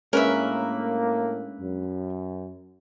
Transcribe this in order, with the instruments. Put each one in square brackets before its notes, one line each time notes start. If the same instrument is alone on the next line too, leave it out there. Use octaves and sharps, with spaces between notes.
[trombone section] A2 A#3 [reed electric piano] G#3 C#4 D4 [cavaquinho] A#4 B4 E5
[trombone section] F#2